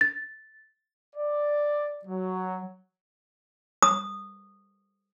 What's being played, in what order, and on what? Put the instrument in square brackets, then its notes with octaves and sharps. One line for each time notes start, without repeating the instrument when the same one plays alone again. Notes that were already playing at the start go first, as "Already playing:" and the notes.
[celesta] A6
[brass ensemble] D5
F#3
[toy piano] D#6